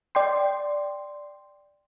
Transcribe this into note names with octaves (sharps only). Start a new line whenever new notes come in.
D5 G5 C6